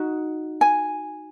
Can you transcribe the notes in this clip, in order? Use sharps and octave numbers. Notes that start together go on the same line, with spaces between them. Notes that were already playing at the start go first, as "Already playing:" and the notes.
Already playing: D#4 F#4
G#5